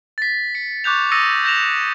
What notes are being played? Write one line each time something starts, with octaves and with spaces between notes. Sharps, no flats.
A6 B6
C#7
C#6 D6 F#6 G6 F7
D#6 E6 A6 A#6 C#7 D#7
G6 A#6 E7 F7